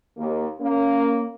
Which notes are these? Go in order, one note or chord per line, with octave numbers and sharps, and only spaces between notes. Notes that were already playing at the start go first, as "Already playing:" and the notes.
D#2 A#3
A#3 C#4